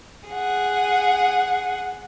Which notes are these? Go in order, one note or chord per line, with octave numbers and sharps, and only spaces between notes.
G#4 F#5